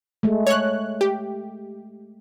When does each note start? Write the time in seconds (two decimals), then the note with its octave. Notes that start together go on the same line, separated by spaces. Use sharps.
0.23 G#3 A3
0.47 C#5 F#6
1.01 G4